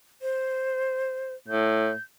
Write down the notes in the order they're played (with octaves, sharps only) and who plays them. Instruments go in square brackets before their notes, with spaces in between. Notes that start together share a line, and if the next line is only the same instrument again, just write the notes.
[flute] C5
[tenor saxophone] A2 [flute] G6